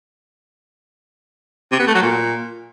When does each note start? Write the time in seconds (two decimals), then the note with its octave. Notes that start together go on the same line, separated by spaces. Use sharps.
1.71 C3
1.79 B3
1.87 A3
1.95 F#3
2.02 A#2